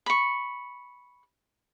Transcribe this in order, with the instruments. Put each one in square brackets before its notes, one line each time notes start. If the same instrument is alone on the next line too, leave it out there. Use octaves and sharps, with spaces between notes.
[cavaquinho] B5 C#6